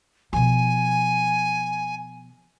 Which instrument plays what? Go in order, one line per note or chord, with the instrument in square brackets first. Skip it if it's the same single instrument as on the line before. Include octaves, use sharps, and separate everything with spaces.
[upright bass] B2 F3 [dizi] G#5